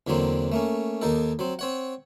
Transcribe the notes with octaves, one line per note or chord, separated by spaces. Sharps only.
E2 D3 F#3 A#3 C4
A3 A#3 C#4
D#2 A#3 D#4 A4
F#3 C4
C4 C#5 F#5